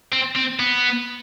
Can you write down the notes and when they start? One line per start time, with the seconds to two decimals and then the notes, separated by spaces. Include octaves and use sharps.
0.12 C4
0.36 C4
0.60 B3